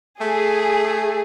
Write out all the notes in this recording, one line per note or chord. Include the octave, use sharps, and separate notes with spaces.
A3 G#4